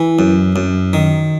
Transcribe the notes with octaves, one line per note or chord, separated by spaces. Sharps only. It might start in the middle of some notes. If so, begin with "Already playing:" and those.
Already playing: E3
F#2
F#2
D#3